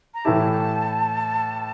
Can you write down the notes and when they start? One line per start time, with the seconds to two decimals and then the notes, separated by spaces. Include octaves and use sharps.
0.14 A#5
0.25 A2 E3 A3 E4 G4 A5